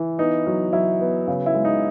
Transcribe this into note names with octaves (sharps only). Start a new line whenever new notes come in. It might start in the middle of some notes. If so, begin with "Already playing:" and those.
Already playing: E3
B3 D#4
F#3
F#3 E4
B3
C#3
E4
G#3
D#4